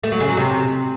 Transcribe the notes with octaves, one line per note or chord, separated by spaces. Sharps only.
A3
F#3
C#3
F#3
C3